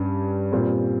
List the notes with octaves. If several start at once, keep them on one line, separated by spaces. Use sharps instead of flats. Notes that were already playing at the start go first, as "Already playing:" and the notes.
Already playing: G2 G3 C#4 G4
A#2 G3 C4 F4